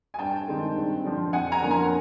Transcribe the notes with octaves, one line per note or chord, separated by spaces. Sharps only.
G#5
G2 G5 A5
D#3 G#3 C4
G2
D3 F3
F2 F#5 G#5
G#5 A#5
D3 F3 A#3 C#4
G#5 A#5